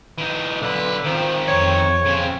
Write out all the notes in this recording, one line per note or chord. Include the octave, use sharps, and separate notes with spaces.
E3 D#4
B1 D3 B4
D#3 F3 C4
F2 C#5
C#3 C4